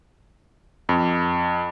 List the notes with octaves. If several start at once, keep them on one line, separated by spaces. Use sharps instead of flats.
F2